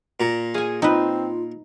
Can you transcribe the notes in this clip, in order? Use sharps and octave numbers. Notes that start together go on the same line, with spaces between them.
A#2 A#5
G#4 F5 G#5
C4 D#4 F4 B4